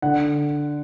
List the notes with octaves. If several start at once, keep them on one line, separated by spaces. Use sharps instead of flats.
D3 F#5